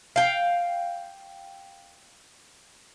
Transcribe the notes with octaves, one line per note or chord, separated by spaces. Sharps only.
F5 G5